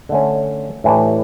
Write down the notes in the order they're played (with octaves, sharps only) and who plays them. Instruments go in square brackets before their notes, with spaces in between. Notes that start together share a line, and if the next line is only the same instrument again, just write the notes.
[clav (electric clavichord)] D3 A3 C#4
A2 E3 A3 D4 G4